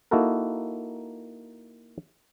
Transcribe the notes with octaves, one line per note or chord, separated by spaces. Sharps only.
A#3 D#4 E4 F#4 A4 A#4